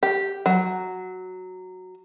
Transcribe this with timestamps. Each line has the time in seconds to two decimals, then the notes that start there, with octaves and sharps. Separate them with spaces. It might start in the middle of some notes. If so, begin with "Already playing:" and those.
0.03 G4
0.46 F#3